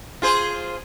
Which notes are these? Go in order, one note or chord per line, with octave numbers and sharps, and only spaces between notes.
F4 G#4 C5